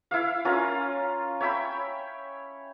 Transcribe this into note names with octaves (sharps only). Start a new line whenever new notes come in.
E4 E5 F5
C#4 F4 A#4
C#5 E5 G5 B5